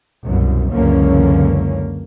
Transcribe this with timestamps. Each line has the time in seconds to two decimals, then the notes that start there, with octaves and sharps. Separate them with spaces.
0.23 C2 F#2 B2
0.71 C#2 F#2 D3 E3 A#3 C#4